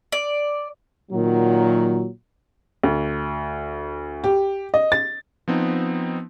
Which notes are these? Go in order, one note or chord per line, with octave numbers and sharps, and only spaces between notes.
D5
A#2 D#3 F#3
D2
G4
D#5
A6
F3 B3 C4 D#4